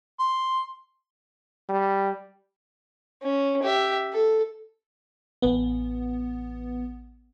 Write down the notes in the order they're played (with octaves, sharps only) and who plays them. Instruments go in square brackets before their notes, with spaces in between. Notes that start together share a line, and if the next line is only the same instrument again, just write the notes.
[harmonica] C6
[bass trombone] G3
[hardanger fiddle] C#4
G4 E5
A4
[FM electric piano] A1 B3